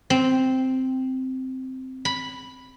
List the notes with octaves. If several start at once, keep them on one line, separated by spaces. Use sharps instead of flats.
C4
B5